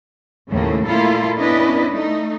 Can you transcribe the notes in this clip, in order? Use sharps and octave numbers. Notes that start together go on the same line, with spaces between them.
D#2 A2 C#3 F3 A3 A#3
A#2 A3 A#3 E4 F4 A4
B3 C#4 D4 E4 B4 D#5
A3 D#4